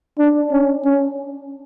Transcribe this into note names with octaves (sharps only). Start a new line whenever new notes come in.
D4
C#4
C#4